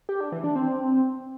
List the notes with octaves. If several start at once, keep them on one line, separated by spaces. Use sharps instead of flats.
G4
D4
E3
D4
C4